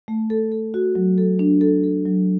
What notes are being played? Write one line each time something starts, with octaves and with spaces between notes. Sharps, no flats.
A3
A4
A4
F#4
F#3
A4
D4
A4
A4
F#3